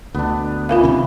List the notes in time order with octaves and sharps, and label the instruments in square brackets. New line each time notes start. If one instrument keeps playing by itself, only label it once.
[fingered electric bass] D2 [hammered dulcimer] B3 D4
[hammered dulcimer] C#3 E3 [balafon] F4 A#4 F5
[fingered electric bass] C3 D#3 C#4